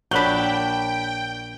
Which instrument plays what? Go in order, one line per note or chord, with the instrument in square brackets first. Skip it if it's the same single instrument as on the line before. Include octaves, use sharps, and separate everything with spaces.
[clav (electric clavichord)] A#1 [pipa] F#3 D4 [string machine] G5 [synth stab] B5 F#6 G6